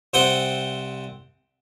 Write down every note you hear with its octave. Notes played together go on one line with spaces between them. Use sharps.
C2 C4 C5 F#5 G5 D#6